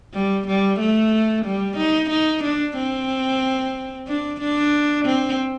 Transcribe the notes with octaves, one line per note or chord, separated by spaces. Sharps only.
G3
G3
A3
G3
D#4
D#4
D4
C4
D4
D4
C4